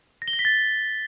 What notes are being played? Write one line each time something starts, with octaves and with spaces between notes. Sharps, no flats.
A#6
G7
A#6
B6
A6